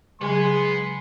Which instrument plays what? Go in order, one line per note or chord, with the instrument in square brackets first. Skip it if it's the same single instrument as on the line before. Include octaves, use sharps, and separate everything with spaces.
[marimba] C#3 F#3 [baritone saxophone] G#3 [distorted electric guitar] B3 [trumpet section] G#5 C6